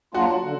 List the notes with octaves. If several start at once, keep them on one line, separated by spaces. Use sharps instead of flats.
F#3 A#3 D4 F4 F#4 F#5
D3